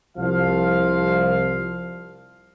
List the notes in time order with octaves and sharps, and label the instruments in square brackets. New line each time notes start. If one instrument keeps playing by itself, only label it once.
[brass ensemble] C2 F3 F5